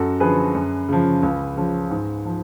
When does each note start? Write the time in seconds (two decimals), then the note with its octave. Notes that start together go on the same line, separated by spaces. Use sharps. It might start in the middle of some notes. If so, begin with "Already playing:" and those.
Already playing: F#2 F#4 A4
0.20 D3 F3 G#4 B4
0.54 F#2
0.89 C#3 F3
1.23 C#2
1.57 C#3 F3
1.91 G#2
2.25 F3